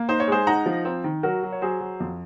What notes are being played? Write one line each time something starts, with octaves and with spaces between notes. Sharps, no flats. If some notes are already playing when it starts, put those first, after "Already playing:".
Already playing: A#3
D#4 C5
C#5
G#3 G#4 C5
D#4 F#5 A#5
F3
C4
D#3
F#3 F#4 A#4
F#3
C#5
F#3 G#4 C5
F#3
F2